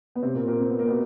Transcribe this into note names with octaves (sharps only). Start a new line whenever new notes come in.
B3
C3 C4
A#2 A#3
A#2 A#3
C4
B3
A#3
B2 B3